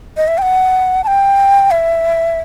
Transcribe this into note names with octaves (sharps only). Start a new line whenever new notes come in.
D#5
E5
G5
F#5
A5
G5
E5